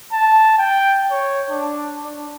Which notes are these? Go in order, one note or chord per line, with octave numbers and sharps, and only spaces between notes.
A5
G5
C#5
D4
D4